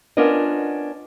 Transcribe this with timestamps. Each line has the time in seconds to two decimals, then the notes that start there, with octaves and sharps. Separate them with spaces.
0.17 B3 C#4 D4 F4 A#4 D#5